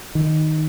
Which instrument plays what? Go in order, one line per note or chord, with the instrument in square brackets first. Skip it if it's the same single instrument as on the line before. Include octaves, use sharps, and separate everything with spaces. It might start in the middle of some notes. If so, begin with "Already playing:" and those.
[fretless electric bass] D#3